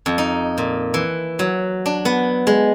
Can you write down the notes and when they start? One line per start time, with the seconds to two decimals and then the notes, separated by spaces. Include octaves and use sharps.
0.06 F2
0.18 D#4
0.58 A#2
0.94 E3
1.39 F#3
1.86 D4
2.05 B3
2.47 G#3